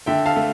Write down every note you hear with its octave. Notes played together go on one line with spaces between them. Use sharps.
D3 E5 G5
F5 A5
A3